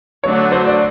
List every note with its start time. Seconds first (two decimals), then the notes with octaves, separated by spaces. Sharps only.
0.24 D3 F#3 A3 D4 F#4 C#5
0.52 C5
0.67 D5